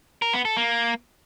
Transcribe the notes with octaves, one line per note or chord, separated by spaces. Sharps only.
A#4
B3
A4
A#3